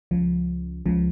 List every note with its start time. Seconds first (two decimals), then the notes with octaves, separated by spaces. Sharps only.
0.11 C#2 C#3 F3
0.86 C#2 C#3 F3